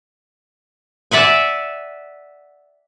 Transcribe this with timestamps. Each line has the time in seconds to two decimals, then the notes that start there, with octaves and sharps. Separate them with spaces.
1.11 D5 E5 F#5 G#5